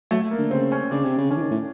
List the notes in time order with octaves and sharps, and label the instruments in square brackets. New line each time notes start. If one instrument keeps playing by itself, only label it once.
[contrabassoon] F#3 [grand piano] A3
[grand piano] A#3
[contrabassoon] D3
[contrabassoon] C#3 [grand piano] C4
[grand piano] C#4
[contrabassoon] C#3 [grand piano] D4
[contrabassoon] C3
C#3
[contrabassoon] D3 [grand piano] C#4
[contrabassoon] E3
D#3
A2